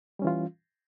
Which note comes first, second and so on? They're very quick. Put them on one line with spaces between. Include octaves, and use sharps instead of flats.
G3 C#4 E3 F4